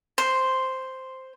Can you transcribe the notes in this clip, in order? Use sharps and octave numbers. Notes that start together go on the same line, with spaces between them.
C5